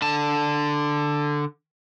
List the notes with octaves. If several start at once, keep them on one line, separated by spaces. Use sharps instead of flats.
D3 A5